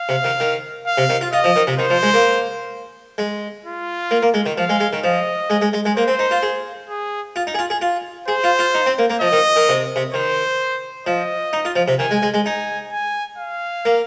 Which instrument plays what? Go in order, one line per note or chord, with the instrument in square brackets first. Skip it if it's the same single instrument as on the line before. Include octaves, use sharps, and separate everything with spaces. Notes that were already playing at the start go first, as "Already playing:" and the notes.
Already playing: [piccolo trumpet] F5
[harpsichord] C3
D#3
D#3
[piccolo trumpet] F5
[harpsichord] C3
D#3
F4
[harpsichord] F4 [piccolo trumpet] D#5
[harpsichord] F3
D#3
C3
[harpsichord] D#3 [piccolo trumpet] C5
[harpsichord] F3
G#3
A#3
G#3
[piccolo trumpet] F4
[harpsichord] A#3
A#3
G#3
D#3
[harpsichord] F3 [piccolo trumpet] F5
[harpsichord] G#3
G#3
D#3
[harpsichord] F3 [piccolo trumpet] D#5
[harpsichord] G#3
G#3
G#3
G#3
[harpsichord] A#3 [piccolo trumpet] C5
[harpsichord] C4
D#4
F4
G#4
[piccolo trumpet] G#4
[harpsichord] F4
D#4
G#4
F4
G#4
F4
[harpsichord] G#4 [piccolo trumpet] C5
[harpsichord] F4
F4
D#4
C4
A#3
A#3
[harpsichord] F3 [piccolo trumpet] D#5
[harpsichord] D#3
D#3
C3
C3
[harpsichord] D#3 [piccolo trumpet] C5
[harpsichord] F3 [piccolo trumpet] D#5
[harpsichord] D#4
F4
F3
C3
[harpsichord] D#3 [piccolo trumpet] G#5
[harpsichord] G#3
G#3
G#3
[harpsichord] D#4 [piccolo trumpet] G#5
[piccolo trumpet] G#5
F5
[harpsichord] A#3